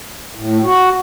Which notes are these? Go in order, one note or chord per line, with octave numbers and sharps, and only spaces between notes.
A2
F#4